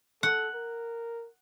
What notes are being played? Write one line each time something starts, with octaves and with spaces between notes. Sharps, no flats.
A4 F#5
A#4